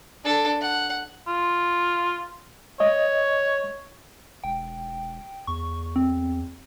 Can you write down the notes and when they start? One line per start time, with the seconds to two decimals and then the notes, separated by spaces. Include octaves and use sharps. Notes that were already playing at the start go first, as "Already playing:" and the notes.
0.24 D4 A4
0.61 F#5
1.27 F4
2.80 C#5 D#5
4.44 E1 G5
5.47 E2 C#6
5.96 C4